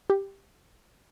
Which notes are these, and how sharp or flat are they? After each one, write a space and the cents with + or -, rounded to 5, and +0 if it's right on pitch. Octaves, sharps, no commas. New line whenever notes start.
G4 +5